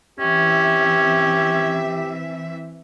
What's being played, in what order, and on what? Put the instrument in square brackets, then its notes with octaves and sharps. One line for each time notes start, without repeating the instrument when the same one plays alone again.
[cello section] E3 C4 E5 [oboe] C#4 [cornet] G4